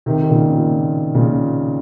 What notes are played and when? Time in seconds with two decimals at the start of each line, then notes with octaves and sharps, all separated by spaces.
0.06 C3 D#3
0.23 D#3
0.30 A#2 C#3
0.54 A#2
1.14 A#2 C#3